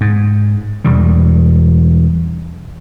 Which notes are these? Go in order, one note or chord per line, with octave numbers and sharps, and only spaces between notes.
G#2
E1 E2 G3